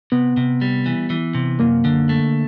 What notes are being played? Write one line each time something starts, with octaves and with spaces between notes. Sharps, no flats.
C3 B3
C3
G3
E3
E3
C3
F#2 A#3
D3
A3